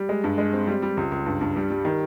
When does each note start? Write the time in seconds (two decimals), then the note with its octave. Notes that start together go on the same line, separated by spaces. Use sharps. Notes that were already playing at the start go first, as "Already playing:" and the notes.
Already playing: G3
0.09 G#3
0.24 G2
0.38 G#3
0.53 C4
0.67 G3
0.82 G3
0.97 C#2
1.12 C#2
1.26 G2
1.41 G2
1.56 G3
1.70 G3
1.85 D#3